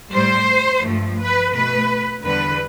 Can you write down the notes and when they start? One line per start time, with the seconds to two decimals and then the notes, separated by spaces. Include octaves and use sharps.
0.12 A2 G3 C5
0.83 G2 F3 A3
1.19 B4
1.54 B2 A3 B4
2.25 E2 D3 G3 B4